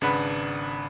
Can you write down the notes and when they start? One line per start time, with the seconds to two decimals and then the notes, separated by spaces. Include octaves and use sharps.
0.01 G#1 C#3 D4 B4 F#5 B5